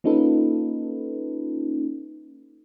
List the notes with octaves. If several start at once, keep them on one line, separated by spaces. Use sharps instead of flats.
A#3 C#4 D#4 F4 A4 B4